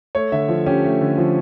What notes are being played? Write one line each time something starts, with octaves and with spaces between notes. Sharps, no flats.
A3 C#5
D3 E5
F3
C#4 G4
A3
D3
F3